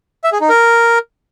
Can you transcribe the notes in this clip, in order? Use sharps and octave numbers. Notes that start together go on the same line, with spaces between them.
E5
G#4
D#4
A#4